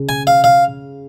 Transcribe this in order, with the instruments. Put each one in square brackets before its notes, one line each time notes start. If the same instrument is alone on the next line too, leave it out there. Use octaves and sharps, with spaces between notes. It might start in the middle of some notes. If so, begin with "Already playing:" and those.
Already playing: [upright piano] C#3
[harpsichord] G#5
F5
F5